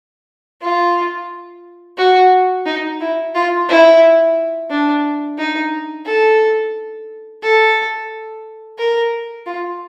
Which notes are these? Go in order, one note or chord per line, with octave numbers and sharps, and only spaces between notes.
F4
F#4
D#4
E4
F4
E4
D4
D#4
A4
A4
A#4
F4